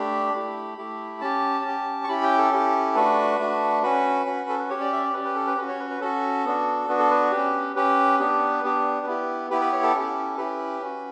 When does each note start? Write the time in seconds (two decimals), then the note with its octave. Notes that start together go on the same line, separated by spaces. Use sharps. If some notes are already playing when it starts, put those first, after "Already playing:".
Already playing: A3 D4 G4 B5
0.34 A3 E4 G4
0.78 A3 E4 G4
1.21 C#4 G4 A5
1.64 C#4 G4
2.04 C#6
2.08 C#4 E4 G4 B5
2.24 G5
2.38 A4
2.51 C#4 E4 G4
2.95 A3 D4 F#4 B4
3.39 A3 D4 F#4
3.83 C#4 F#4 B4
4.26 C#4 F#4
4.49 A4
4.59 B4
4.70 C#4 G4 C#5
4.81 D5
4.93 E5
5.03 D5
5.13 C#4 G4 B4
5.25 B4
5.36 A4
5.47 B4
5.57 C#4 F#4 B4
5.69 C#5
5.80 B4
5.90 B4
6.01 C#4 F#4 A4
6.45 B3 D4 F#4
6.88 B3 D4 F#4 B4
6.99 A4
7.11 B4
7.32 C#4 G4
7.76 C#4 G4 B4
8.19 B3 D4 G4
8.64 B3 D4 G4
9.06 B3 E4 G4
9.51 B3 E4 G4 B4
9.61 B4
9.72 C#5
9.83 A4
9.94 C#4 E4 G4
10.38 C#4 E4 G4 B4
10.81 C#4 F#4